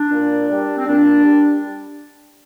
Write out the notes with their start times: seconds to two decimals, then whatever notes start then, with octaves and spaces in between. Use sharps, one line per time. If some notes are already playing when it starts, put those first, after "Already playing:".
Already playing: D4
0.12 A#2
0.49 G3
0.76 C4
0.86 A#2 D4
1.23 G3